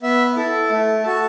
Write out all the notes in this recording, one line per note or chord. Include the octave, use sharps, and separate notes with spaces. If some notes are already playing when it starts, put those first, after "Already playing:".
B3 E5
E4 A4
A3
F#4 A4